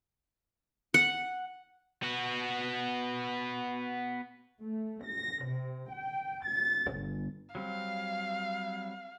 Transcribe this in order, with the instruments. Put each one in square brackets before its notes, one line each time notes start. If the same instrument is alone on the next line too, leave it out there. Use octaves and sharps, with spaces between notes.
[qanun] F#5
[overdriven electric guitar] B3 F#4
[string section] A3
A#6
C3
G5
A6
G1
[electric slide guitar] F#3 G3 C4 [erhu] F5